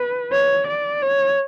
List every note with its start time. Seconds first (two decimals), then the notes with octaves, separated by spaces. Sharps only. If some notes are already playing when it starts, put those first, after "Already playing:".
Already playing: B4
0.32 C#5
0.67 D5
1.02 C#5